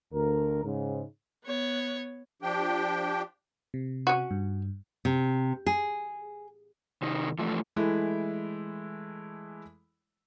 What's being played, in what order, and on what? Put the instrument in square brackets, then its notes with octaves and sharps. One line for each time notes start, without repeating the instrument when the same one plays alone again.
[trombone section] D2 A#4
G#2 C#3
[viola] B3 C#5
[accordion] F3 D4 G4 G5
[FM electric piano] C3
[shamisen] C#4 F#4
[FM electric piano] G2
[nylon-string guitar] C3
G#4
[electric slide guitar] C3 D#3 D#4
E3 F3 A3
[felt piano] E3 G#3 A3 E4